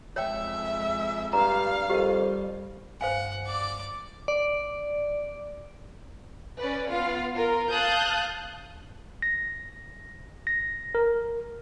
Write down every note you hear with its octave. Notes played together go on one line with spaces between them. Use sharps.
F2 G#3 C#5 E5 G5
G2 F5 A#5
F2 G3 G4 A#4
G2 C5 F5 F#5 G#5
D5 D6
D5
C#4 B4 D5
B3 F4 F5
F4 A#4
F5 A5 D#6 F#6 G6
A#6
A#6
A#4